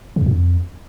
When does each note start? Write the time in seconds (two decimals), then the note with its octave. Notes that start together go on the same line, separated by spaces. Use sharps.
0.16 C#3
0.21 E2
0.26 A#2
0.31 F2